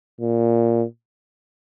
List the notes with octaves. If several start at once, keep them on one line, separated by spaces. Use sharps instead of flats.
A#2